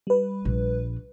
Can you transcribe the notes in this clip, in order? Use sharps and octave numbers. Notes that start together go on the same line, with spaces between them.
G3 B4
A#1